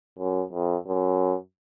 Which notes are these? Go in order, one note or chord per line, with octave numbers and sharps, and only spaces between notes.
F#2
F2
F#2